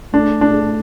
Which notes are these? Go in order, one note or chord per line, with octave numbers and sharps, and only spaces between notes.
A3 D4
D4